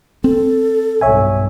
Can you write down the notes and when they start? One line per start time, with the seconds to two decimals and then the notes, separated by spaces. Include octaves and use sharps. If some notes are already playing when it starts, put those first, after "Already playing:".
0.24 C4 A4
1.01 B1 G2 C#5 E5 G#5